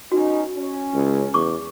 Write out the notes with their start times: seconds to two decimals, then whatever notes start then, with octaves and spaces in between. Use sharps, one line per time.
0.12 B2 C#4 D#4 F#4
0.57 C#4
0.94 C#2
1.34 E2 C#6 D6